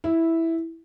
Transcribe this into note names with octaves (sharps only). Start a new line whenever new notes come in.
E4